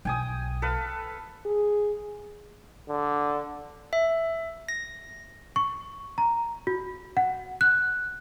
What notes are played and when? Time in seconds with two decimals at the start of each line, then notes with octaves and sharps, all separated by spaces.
0.05 B1 G5 G#5 D#6
0.62 A4 B4 F5
1.45 G#4
2.89 D3
3.93 E5
4.69 A#6
5.56 C#6
6.18 A#5
6.67 F#4
7.17 F#5
7.61 F#6